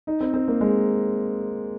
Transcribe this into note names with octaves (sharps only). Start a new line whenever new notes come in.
D#4
C4
C4
A#3
G#3